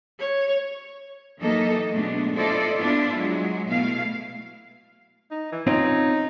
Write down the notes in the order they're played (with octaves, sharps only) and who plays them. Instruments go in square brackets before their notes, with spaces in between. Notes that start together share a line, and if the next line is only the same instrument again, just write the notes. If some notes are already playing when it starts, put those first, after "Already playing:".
[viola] C#5
[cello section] E3 F#3 A#3 D#4 A4 D#5
B2 G#3 A3 B3 D4
E4 F4 A4 C5 D5 D#5
B3 D4 E4 F4
F#3 G#3
B2 A3 E4 F5
[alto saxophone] D#4
E3
[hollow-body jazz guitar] C4 C#4 F4 [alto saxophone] D#4